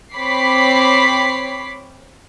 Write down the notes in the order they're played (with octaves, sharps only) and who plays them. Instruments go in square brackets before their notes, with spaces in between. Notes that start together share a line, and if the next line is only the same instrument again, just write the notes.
[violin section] C4 C#5 B5 D6 B6 C7